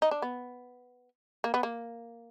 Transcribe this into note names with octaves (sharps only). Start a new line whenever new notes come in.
D#4
D4
B3
A#3
B3
A#3